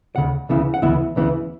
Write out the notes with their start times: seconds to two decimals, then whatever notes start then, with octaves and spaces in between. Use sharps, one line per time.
0.16 D2 C#3 F#5
0.49 D2 C#3 E3 B3 E4
0.74 F#5
0.82 D2 C#3 E3 B3 E4 E5
1.16 D2 C#3 E3 B3 E4